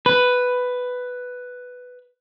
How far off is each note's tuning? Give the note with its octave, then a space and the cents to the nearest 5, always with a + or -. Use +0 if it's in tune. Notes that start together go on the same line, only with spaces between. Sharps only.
B4 +5